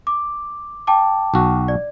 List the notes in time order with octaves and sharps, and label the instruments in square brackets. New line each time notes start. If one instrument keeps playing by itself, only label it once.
[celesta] D6
G5 A5 D6
[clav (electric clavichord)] B1 F#4
[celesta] D5